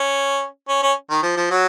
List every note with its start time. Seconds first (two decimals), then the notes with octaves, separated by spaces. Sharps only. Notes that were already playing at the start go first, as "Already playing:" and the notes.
Already playing: C#4
0.68 C#4
0.82 C#4
1.10 D#3
1.23 F3
1.37 F3
1.51 F#3